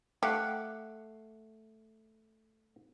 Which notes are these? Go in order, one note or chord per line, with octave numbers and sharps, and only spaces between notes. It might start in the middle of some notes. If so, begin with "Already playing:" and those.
A3 G4 F5 F#5